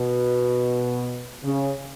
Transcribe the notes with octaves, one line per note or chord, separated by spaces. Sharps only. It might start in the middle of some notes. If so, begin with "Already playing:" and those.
Already playing: B2
C#3